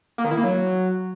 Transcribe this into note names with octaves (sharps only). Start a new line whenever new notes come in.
A#3
D#3
E4
A#3
F#3